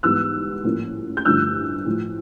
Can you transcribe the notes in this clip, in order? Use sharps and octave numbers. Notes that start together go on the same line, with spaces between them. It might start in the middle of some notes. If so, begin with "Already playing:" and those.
G#2 E3 G3 B3 E6 F#6
A2 F3 A#3 C#4
G6
G2 D3 F3 A3 E6 F#6
A2 F3 A3